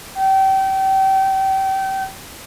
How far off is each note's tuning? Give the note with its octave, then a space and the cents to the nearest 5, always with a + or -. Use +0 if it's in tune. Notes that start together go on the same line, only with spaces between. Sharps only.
G5 -30